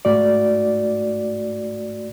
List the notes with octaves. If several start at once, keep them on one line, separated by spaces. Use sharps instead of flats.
G#2 A3 F#4 D5